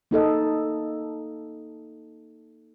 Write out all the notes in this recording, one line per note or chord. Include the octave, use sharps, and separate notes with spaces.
A#3 D#4 A4 D#5